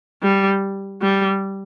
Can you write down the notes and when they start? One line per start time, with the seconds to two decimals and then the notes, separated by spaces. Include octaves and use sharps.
0.23 G3
1.02 G3